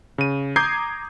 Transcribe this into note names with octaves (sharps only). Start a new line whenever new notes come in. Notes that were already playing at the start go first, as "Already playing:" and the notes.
C#3 D#7
A#5 D6 D#6 G6 G#6 C7